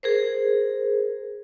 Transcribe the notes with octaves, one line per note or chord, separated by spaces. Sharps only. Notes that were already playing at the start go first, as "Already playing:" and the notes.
G#4 A#4 C5